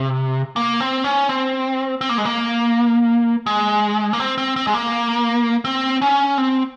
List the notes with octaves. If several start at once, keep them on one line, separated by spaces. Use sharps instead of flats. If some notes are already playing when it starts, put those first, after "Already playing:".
Already playing: C3
A#3
C4
C#4
C4
C4
A#3
G#3
A#3
G#3
A#3
C4
C4
C4
G#3
A#3
C4
C#4
C4